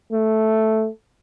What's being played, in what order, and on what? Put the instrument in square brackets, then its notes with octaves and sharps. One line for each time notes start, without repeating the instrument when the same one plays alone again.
[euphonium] A3